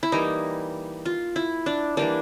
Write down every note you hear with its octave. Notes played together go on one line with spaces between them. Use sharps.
E4
E3 G3 A#3 D#4
F4
E4
D4
E3 G3 A#3 D4